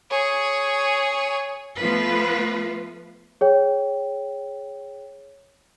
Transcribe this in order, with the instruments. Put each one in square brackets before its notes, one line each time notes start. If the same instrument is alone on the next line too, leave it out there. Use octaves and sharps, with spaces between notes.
[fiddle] G#4 C#5
[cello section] F3 A3 B3 F4 B4
[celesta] G#4 C#5 G5